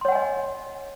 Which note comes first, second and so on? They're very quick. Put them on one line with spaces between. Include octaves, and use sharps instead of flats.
C6 C#5 F#5 G#5 D#5